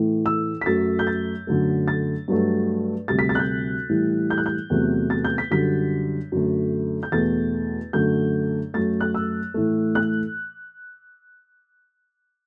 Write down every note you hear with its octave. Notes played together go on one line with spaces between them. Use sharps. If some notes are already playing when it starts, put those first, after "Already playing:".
Already playing: A2 E3 A3
E6
B6
F#2 F#3 A3 A6
G6
A6
F#2 D3 F#3 A3
A6
G2 F#3 A3
D2 C3 G3 A6
B6
A6
F#6
G6
A2 E3 G3
G6
F#6
G6
E2 C3 F#3 A3
A6
G6
B6
F#2 D3 G3 B6
F#2 D3 A3
G6
E2 B2 A3 A6
F#2 D3 A3 G6
F#2 F#3 A3 A6
F#6
E6
A2 E3 A3
F#6